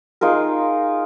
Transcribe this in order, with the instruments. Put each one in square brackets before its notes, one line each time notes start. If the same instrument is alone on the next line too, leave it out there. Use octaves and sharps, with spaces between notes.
[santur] D#4 F4 G#4 A#4